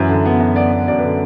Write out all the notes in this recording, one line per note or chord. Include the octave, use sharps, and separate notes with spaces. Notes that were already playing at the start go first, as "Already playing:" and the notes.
Already playing: F#2 E3 B4 E5
D3
B3
F#2
B3 D5
B3
F#2 D5
B4
D3